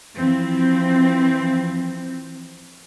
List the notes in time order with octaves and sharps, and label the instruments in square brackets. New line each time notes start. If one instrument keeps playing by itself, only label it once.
[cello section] E3 F3 C4